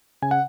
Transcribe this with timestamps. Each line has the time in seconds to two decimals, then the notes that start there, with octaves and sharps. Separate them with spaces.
0.22 C#3 G#5
0.31 F#5